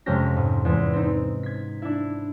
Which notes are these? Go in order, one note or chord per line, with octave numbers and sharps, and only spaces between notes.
F2 C3 G#3 C#4 G4 A#6
G#2
E2 G#3
C4 D#4
G#6 B6
D4 E4